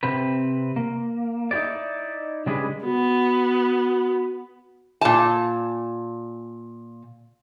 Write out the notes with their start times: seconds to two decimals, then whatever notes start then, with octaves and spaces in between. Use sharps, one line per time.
0.03 C3 C4 B4
0.76 A#3
1.51 D#4 E4 G4 B4 D5
2.46 C#3 G3 G#3 D4 G#4 B4
2.85 B3 F#4
5.01 A#2 A5